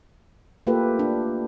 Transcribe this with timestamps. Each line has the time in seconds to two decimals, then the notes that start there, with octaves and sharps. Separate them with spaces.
0.67 A3 A#3 F4 G4 A4 B4
0.99 D4